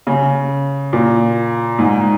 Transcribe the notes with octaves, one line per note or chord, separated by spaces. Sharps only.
C#3
A#2
G#2